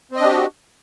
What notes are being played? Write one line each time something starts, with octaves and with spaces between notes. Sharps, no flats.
C4 D4 F#4 G4 D#5